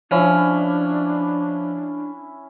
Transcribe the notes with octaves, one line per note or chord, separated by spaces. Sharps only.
F3 C#4 D4 E4